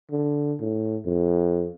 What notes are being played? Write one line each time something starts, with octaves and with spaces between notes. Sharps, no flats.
D3
A2
F2